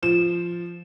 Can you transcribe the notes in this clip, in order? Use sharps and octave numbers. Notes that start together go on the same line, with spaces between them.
F3 E7